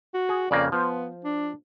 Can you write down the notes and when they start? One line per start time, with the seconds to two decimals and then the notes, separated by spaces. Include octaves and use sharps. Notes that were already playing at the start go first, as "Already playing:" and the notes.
0.15 F#4
0.29 G#4
0.51 F2 C#3 A#3 D5
0.72 F3 B3 C5
1.25 D4